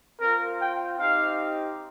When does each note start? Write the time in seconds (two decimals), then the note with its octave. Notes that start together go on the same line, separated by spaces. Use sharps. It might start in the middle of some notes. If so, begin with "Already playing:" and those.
0.21 C4 F4 A#4
0.61 G5
0.99 C4 D#4 G4 F5